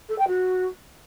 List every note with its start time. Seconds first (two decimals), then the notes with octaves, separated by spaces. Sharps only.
0.09 A4
0.18 G5
0.28 F#4